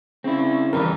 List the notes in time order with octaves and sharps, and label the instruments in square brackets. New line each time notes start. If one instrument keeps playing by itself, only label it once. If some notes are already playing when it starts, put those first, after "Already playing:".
[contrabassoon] C#3 [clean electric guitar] C4 E4
[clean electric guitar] E2 G3 B4 [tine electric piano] E3 A#4